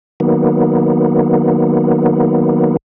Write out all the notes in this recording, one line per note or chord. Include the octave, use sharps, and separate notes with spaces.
D#3 F#3 A#3 B3